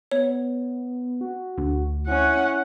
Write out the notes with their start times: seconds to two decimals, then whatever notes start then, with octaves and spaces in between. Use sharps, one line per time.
0.11 B3 C#5
1.21 F#4
1.58 D2
2.07 C#4 E4 F#5